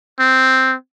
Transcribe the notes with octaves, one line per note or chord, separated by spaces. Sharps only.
C4